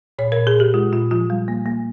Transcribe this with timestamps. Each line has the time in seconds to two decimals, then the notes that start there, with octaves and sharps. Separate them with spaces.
0.18 A#2 C#5
0.32 A#2 A#4
0.47 G#4
0.56 A#2 G4
0.74 G#3 F4
0.93 A#2 F4
1.11 F3 F4
1.30 G3
1.48 A#3
1.66 A#3